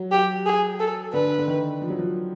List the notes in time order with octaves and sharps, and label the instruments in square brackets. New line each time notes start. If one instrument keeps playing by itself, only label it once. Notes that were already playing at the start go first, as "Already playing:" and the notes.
Already playing: [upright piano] F#3
[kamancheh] G4
G#4
A4
[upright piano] D3 [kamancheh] B4
[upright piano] D3
D#3
F3
F#3
F3